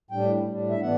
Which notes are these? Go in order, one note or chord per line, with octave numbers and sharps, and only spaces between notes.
A2 G3 D4 G5
A2 G3 D4
E5
A2 E3 B3 D4 F#5